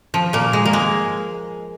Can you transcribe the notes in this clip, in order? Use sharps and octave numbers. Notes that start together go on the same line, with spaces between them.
F3
A#2 A#3
G#3
A#3
G#3